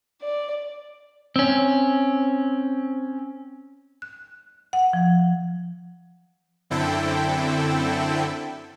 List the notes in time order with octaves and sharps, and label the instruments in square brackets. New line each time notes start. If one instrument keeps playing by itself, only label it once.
[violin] D5
[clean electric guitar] C4 C#4
[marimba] F#6
F#5
F3
[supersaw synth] F#2 D3 C4 E4 A4 G5